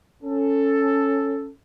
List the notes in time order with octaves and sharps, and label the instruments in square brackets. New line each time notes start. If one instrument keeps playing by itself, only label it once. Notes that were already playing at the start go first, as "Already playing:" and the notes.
[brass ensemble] C#4 A4